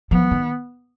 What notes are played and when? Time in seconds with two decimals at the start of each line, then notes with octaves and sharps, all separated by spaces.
0.11 F3 B3
0.31 D#3